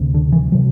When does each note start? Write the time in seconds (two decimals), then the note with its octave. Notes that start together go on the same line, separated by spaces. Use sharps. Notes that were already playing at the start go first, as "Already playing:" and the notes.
Already playing: D2 C3
0.14 D3
0.32 E3
0.52 C3 F#3